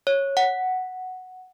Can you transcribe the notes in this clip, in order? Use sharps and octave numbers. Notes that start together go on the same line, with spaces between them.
C#5
F#5